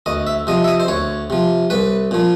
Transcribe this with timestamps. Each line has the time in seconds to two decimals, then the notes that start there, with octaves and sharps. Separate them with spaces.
0.06 D2 D#5
0.27 E5
0.47 C3 F3 D#5
0.64 E5
0.68 D#5
0.80 C5
0.88 D2 C#5
1.30 C3 F3
1.70 C2 B4
2.11 A#2 F3